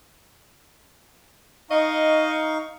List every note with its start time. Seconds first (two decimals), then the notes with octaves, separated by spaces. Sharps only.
1.71 D#4 D#5 F5 C#6